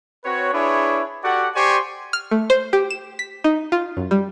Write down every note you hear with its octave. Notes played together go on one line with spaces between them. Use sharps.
C4 F#4 B4 C#5
D4 E4 G#4 B4 C#5
F#4 G4 A4 D5 F#5
G4 C5 D5 G#5 C6 C#6
F6
A3
C5
G4
E7
B6
D#4
F4
F#2
G3